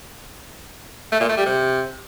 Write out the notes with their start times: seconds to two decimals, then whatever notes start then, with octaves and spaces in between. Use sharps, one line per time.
1.12 A3
1.21 A#2
1.29 A3
1.38 G3
1.46 C3